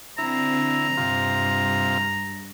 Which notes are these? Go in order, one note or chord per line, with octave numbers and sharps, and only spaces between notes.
D3 C4 E4 A#5
G2 C3 F4